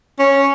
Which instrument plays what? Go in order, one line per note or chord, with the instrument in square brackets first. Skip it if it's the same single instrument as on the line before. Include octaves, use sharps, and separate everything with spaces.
[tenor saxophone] C#4